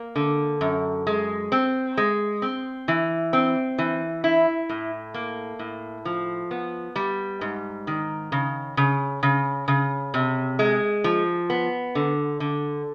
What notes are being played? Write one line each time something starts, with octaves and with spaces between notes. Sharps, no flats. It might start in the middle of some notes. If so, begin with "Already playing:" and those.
Already playing: A#3
D3
F#2
G#3
C4
G#3
C4
E3
C4
E3
E4
A2
A#3
A2
F3
B3
G3
G#2
D#3
C#3
C#3
C#3
C#3
C3
G#3
F3
B3
D3
D3